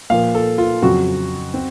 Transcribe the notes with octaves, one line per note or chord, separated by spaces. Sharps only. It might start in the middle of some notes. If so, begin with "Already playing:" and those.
A#2 F3 A#3 F5
A4
F4
F2 C#3 F#3 C4 F#4
C4